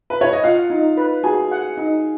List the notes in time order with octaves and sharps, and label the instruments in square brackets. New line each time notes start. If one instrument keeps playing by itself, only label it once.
[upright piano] B4
C#5
D#5
[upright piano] F4 F5 [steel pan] F#5
[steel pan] D#4
B4
[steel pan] F#4 [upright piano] G#4 G#5
[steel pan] F#5
D#4